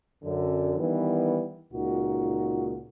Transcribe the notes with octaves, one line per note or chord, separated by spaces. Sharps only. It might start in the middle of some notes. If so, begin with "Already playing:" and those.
F#2 D3
D#3 E3 G3 B3
C#2 A#2 D#4 F#4